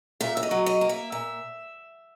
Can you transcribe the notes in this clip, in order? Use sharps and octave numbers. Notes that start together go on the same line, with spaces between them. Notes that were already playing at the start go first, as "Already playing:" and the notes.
A#2 E5
E5
D#5
F#3
D#5
A#3
E5
A#2 E5